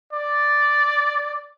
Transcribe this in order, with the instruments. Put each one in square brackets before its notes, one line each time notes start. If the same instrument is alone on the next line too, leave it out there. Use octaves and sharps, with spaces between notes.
[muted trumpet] D5